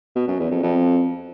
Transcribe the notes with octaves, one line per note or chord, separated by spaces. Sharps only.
B2
F#2
E2
F2
F2